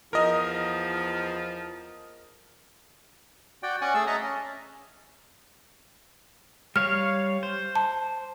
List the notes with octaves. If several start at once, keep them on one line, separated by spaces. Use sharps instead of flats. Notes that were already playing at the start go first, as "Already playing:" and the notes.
E2 F3 A#4 D#5
F#4 D5 G5
C#4 D5 F#5 G#5
A3 G#4 A4 E6
D#5 E5 A5 A#5
C#4
G3 C#5 F5 F6
C5
A5